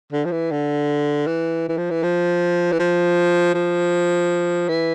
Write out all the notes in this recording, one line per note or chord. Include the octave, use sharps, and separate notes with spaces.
D3
F3
E3
D3
E3
E3
F3
E3
F3
E3
F3
F3
E3